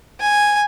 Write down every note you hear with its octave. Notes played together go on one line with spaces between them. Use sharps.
G#5